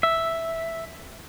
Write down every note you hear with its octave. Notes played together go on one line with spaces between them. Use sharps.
E5